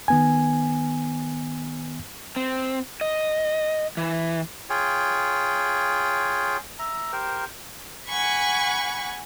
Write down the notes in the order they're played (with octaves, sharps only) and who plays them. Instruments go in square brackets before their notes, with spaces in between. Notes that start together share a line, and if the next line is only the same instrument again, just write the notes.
[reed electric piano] D#3 B3 G#5
[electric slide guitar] C4
D#5
E3
[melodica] F4 G#4 C#5 G5
E5 A#5
G4 A#4 C5
[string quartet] F#5 G#5 B5 C#6